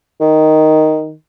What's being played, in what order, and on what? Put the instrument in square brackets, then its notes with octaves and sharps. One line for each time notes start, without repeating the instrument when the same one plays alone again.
[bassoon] D#3